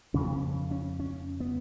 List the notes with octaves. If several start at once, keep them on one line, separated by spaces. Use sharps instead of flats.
F2 C#3 C#4
B3
C#4
C#4
C#4
B3